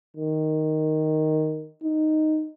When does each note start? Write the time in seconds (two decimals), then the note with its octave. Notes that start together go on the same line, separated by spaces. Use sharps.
0.17 D#3
1.83 D#4